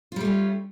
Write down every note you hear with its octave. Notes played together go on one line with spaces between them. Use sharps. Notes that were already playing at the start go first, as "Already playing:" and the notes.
G3 A3 C#4 F4